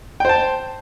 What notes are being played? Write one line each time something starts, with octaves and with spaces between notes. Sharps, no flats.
C5 G5 A5